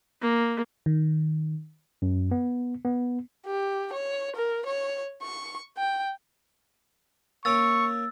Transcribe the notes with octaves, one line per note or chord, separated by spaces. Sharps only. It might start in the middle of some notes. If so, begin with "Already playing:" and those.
A#3
D#3
F#2
B3
B3
G4
C#5
A#4
C#5
C#6
G5
A#3 C#4 C#6 D6 E6 A6